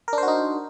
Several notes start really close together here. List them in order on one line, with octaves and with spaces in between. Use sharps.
A#4 D4 C5 F#4 D#4